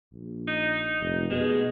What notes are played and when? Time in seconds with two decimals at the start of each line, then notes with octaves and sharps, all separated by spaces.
0.13 A#1
0.47 D#4
1.01 F1
1.30 B2 G#3